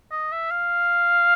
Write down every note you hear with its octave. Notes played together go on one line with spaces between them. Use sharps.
D#5
E5
F5